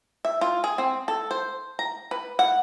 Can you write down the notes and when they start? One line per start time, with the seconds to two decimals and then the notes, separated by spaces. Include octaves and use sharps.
0.25 E5
0.41 F4
0.64 G#4
0.78 C4
1.08 A4
1.31 C5
1.79 A#5
2.11 B4
2.39 F#5